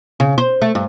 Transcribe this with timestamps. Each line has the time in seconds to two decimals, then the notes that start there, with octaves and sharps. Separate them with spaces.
0.20 C#3
0.38 C5
0.62 A3
0.75 G2